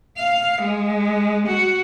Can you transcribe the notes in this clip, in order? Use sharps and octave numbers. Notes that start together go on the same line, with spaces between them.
F5
G#3
F#4